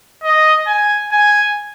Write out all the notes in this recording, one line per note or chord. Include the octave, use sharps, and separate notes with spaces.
D#5
G#5
G#5